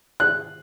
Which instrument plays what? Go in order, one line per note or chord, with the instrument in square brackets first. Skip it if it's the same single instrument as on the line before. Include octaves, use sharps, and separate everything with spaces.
[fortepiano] F#6